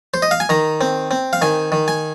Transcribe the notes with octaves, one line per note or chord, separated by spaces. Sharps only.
C5
D#5
F5
G#5
D#3 A#5
C4
C4
F5
D#3 G#5
D#3
G#5